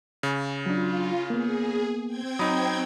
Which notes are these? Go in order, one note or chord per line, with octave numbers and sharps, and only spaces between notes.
C#3
F#3 D4 F4
A#3 B3 G#4
C4 G5 G#6
F#3 D#4 B5 D#6